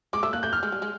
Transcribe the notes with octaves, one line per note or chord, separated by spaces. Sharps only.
G#3 D6
A3 E6
A#3 F#6
A3 G6
F6
G#3
G3
G#3